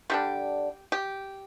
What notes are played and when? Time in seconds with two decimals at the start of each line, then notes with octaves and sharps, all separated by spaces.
0.10 D3 G3 D4 G4
0.92 G4